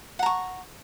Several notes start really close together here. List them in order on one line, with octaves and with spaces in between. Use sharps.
F#5 A#5 C#6